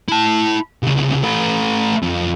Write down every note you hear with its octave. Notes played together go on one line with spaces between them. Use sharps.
E4 A5
C2 C#3
A3 B4
F2